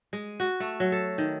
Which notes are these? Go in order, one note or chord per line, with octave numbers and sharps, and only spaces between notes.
G#3
F#4
A3
F#3
A4
D#3